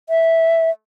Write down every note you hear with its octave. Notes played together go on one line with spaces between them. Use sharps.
E5